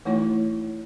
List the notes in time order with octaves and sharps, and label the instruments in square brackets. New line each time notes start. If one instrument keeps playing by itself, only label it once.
[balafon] E3 A3 D#4 E4 C#5